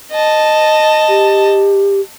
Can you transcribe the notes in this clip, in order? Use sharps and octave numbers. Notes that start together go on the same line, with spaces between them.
D#5 A5
G4